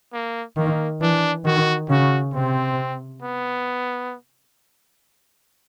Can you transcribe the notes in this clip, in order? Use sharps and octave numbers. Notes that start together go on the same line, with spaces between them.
A#3
D#3 A#3
E3 D4
D#3 F#4
C#3 F#4
C3 C4
B3